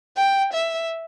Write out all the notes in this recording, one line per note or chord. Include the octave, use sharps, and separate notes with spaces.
G5
E5